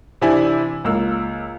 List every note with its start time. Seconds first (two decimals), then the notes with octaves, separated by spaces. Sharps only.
0.21 C3 E3 D4 E4 G#5
0.84 C#2 A#3 E6